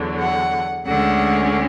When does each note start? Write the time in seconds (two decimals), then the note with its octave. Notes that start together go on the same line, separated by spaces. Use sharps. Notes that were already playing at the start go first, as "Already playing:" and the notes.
Already playing: E2 D3 F#3
0.19 F#5
0.85 D2 D3 G#3 C#4 F#5